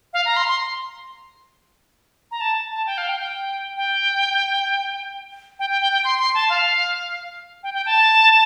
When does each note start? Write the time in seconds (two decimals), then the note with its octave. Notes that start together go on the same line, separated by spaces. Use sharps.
0.13 F5
0.25 A#5
0.36 C6
0.48 C6
2.31 A#5
2.40 A5
2.72 A5
2.86 G5
2.98 F5
3.09 G5
3.20 G5
3.77 G5
5.59 G5
5.70 G5
5.82 G5
5.92 G5
6.04 C6
6.19 C6
6.34 A5
6.49 F5
7.63 G5
7.74 G5
7.86 A5